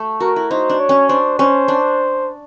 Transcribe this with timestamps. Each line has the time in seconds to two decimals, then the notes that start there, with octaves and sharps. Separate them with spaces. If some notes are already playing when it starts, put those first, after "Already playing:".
Already playing: A3
0.20 F#4 A#4
0.36 E4
0.51 D#4 C5
0.70 D4
0.80 C#5
0.89 C#4
1.09 D4 C5
1.39 C#4 C5
1.68 D4